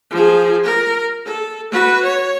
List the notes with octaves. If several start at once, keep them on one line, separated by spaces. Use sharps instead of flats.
F3 G#4
A#4
A4
F#4 B4
C#5